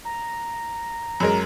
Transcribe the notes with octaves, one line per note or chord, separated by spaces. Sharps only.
A#5
F#2 G#3 A#4